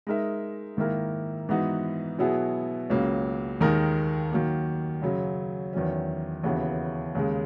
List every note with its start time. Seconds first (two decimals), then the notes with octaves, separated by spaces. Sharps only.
0.07 G#3 D#4 A#4 E5
0.77 G#2 D#3 A#3 E4 A#4
1.49 G#2 E3 B3 D#4 F#4
2.19 B2 F#3 B3 E4 G#4
2.90 C#2 C#3 F#3 A#3 C#4
3.61 D#2 D#3 G#3 D#4 A#4
4.32 D#3 F#3 A#3
5.02 F#2 C#3 F#3
5.73 E2 D#3 F#3 C#4
6.44 D#2 C#3 E3 B3 F#4
7.15 D#2 C#3 G#3